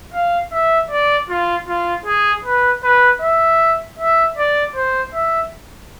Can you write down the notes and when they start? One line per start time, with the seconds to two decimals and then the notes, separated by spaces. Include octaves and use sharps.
0.14 F5
0.52 E5
0.90 D5
1.30 F4
1.68 F4
2.06 G#4
2.44 B4
2.84 B4
3.22 E5
3.99 E5
4.38 D5
4.76 C5
5.14 E5